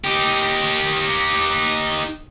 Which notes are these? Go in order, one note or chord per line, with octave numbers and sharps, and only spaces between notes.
D#4 G4